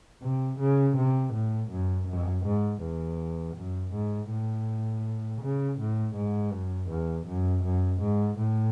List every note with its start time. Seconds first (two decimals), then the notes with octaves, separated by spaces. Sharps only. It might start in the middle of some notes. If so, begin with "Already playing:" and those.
0.22 C3
0.60 C#3
0.97 C3
1.34 A2
1.71 F#2
2.08 F#2
2.45 G#2
2.82 E2
3.56 F#2
3.93 G#2
4.30 A2
5.42 C#3
5.79 A2
6.16 G#2
6.53 F#2
6.90 E2
7.27 F#2
7.64 F#2
8.01 G#2
8.38 A2